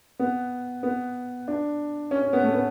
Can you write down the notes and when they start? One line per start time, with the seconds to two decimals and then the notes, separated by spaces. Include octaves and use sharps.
0.19 B3
0.83 B3
1.48 D4
2.11 C#4
2.22 C#4
2.33 B3
2.43 A3
2.54 B3